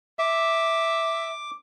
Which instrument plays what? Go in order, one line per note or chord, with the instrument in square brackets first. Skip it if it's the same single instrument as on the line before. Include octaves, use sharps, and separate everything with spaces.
[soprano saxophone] E5 [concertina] D6